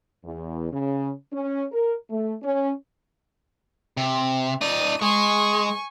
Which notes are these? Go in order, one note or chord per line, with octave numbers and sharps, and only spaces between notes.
E2
C#3
C#4
A#4
A3
C#4
C3
D#4 D5 D#7
G#3 G#5 C#6